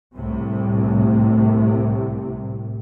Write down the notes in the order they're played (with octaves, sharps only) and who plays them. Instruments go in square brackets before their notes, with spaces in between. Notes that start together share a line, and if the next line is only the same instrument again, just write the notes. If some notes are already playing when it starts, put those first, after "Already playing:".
[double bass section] C2 A2 C3